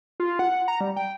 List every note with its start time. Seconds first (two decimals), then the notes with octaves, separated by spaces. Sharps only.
0.20 F4
0.39 F#5
0.68 A#5
0.81 G3
0.96 G5